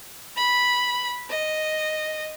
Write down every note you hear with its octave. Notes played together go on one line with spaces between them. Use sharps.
B5
D#5